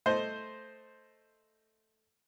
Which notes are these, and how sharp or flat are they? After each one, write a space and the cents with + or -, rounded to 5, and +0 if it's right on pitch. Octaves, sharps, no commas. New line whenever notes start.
A3 +0 C5 +0 D#5 +0